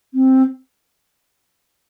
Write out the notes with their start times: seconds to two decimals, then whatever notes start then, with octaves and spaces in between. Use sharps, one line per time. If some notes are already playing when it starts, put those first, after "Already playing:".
0.14 C4